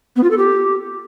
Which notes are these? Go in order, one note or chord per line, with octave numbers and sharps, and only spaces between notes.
B3
F4
A4
G4